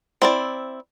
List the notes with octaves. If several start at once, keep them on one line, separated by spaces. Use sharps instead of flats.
C4 E4 D5